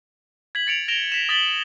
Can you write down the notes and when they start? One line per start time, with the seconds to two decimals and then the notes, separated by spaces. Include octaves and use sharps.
0.55 G#6 B6 F#7
0.67 A6 C#7 D7 F7
0.88 A#6 D7 E7 F7 G7
1.12 B6 E7
1.29 D#6 A6 B6 F#7 G7